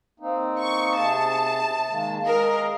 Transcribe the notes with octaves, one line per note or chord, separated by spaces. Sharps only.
A#3 C4 D#4
C#6
C3 G#4 A5
D#3 G#3 A#3
G#3 A#4 D#5 F5